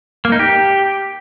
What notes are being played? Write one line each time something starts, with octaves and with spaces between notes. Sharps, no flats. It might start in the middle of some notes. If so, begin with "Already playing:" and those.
A#3
D#4
G4